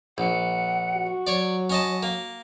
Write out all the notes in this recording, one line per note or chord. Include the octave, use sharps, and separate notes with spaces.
A#1 F#5
F#4
F#3 C#5 D5
C#4 D#5 A5
A#3